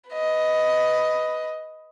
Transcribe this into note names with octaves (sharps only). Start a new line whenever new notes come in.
B4 D#5